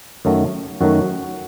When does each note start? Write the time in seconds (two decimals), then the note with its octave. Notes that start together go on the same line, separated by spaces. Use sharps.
0.25 F#2 D#3 F#3 A3
0.81 F#2 D#3 F#3 A3 F#4